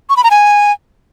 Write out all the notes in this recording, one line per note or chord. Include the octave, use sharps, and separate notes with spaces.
C#6
B5
A#5
G#5